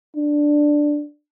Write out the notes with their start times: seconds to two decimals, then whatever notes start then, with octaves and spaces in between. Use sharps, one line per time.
0.16 D4